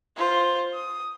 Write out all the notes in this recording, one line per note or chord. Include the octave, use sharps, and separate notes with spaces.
F4 C5
D#6